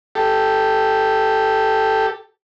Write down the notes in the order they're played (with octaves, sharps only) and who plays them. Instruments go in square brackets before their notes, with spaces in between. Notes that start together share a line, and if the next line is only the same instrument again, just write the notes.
[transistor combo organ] G4 A4